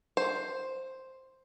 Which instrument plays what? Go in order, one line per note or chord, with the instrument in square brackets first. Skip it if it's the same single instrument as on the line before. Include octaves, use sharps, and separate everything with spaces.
[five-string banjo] C5